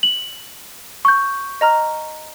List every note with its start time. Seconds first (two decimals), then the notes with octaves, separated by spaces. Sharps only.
0.03 F#7
1.05 C#6 G6
1.61 D#5 A#5 F6